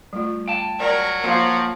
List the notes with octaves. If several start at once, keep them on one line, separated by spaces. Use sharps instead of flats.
G3 A3 F4
F5 G5 A5
F#3 A#4 D5
F3 A#3 F4